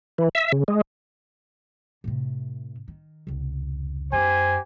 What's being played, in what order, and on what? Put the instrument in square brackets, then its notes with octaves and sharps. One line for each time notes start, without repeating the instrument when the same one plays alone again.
[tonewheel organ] E3
E5
C#3
G#3
[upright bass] A2 C3
D#3
F1 C#2
[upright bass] F#2 B3 [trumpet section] G4 C5 G#5